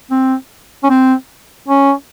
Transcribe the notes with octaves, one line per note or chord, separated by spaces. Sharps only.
C4
C#4
C4
C#4